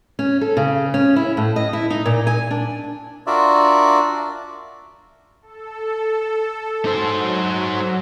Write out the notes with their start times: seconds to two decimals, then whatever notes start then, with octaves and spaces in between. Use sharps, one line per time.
0.19 C#4
0.41 A4
0.57 C#3
0.94 C#4
1.16 E4
1.37 A2
1.56 D#5
1.73 E4
1.90 D#4
2.06 A#2
2.27 G#5
2.51 D4
3.27 D4 F4 F#4 A#4 D5 E5
5.42 A4
6.85 F#3 D#4 C5